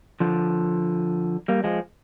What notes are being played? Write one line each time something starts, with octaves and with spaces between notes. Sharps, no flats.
D3 F3
G3 A#3
F3 G#3